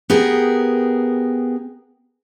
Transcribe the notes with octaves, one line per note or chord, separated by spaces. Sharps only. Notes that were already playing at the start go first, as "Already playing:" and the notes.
B3 G4 G#4 A#4